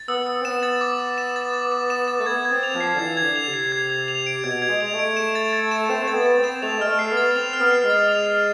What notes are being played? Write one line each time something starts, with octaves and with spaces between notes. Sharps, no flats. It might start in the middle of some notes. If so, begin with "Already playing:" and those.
Already playing: A6
B3 E6
E6
C4
B3 E7
A6
D6
D6
E7
A6
D6
D6
E7
A6
A3
B3 G#6
G#6
C4
F7
F3
C7
D3
E3 G#6
G#6
D3
F7
C3
C7
G#6
G#6
F7
D7
B2 G#6
G#6
G#3
G#3 F7
A3
D7
E7
A6
A6
E7
C4 E7
A3 A6
B3
A6
C4
E7
A3 F7
G#3 F6
A3
C7
B3
A6
C4 F7
F6
B3
C7
G#3
A6
F7
F6